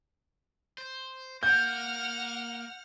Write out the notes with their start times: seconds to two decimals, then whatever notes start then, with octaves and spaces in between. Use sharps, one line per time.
0.78 C5
1.43 A#3 F#5 F6 G6